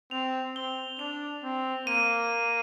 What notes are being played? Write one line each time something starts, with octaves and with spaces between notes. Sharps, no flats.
C4 F7
C4 G7
D4 F7
C4
A#3 D#7